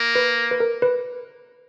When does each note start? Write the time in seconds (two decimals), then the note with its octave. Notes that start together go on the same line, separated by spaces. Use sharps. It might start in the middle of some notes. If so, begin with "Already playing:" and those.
Already playing: A#3
0.15 B4
0.51 B4
0.60 A#4
0.82 B4